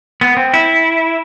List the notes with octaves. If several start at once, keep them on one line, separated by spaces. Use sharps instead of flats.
B3
C4
E4